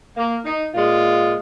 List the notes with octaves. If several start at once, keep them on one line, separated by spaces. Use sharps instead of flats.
A#3
D#4
A#2 G#3 F4